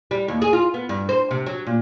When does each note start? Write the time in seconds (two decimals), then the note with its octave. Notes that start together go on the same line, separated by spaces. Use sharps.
0.11 G3
0.28 D#2
0.42 G#4
0.53 F4
0.74 B3
0.89 G2
1.09 C5
1.31 C3
1.46 F#3
1.67 A#2